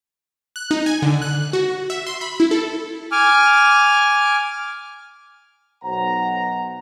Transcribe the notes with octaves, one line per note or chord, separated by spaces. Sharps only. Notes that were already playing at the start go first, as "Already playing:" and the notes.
F#6
D#4
G#5
D3
F#6
F#4
E5
C6
B5
E4
A4
G#5 D6 F6
B1 C5 F#5 A#5